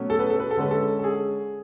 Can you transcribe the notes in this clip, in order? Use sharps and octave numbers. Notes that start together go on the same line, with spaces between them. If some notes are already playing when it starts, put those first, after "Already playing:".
Already playing: B2 F#3 A3 C#4
A4
B4
A4
B4
A4
D3 G#3 C#4 B4
A4
A4
G#4